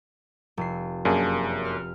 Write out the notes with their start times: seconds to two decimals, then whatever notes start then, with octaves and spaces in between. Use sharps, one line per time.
0.57 F1 C7
1.05 F#2 A#3 D4 G#4
1.65 F6